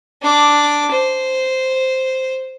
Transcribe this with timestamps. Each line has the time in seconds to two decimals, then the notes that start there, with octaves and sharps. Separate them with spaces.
0.22 D4 D6
0.90 C5